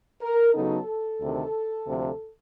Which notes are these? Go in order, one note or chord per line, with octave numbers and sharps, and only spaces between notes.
A#4
C#3 F#3 B3 D#4 A4
D2 C3 D#3
D2 C3 F3